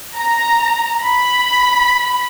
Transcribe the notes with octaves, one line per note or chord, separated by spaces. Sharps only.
A#5
B5